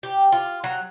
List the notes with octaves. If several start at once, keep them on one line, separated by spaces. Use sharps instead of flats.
G4
F4
F#3